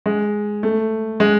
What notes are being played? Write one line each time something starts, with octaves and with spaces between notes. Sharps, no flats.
G#3
A3
G#3